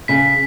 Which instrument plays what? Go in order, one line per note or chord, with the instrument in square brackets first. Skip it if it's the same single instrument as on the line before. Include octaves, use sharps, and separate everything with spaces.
[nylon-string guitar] C#3 [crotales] B6